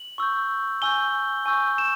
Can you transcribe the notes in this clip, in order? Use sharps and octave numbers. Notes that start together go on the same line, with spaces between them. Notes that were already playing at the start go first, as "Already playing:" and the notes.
Already playing: F#7
C#6 E6 G6
G#5 C#6 E6 G6 G7
G#5 C#6 E6 G6
E7